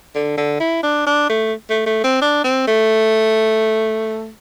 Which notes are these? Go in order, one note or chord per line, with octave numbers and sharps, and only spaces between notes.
D3
D3
E4
D4
D4
A3
A3
A3
C4
D4
C4
A3